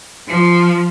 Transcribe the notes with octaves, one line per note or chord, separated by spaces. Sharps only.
F3